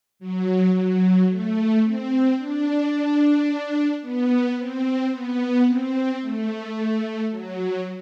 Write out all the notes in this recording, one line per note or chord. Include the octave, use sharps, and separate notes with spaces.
F#3
F#3
A3
C4
D4
B3
C4
B3
C4
A3
F#3